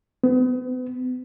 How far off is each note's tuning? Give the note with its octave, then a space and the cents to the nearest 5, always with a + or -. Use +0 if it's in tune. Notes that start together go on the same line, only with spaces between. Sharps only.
B3 +40